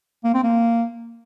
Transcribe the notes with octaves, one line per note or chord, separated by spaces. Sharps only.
A#3
C4
A#3